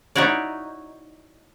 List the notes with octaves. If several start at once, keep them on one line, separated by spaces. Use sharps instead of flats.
D#4 E4 F#4 C#5 D5